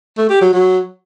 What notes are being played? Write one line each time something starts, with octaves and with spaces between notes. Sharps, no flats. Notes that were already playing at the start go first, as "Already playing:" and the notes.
A3
G4
F#3
F#3